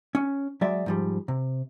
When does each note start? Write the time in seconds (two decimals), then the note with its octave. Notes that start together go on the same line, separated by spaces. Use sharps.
0.15 C#4
0.61 F#3 G#3 D5 E5
0.86 G#2 F3 G3
1.28 C3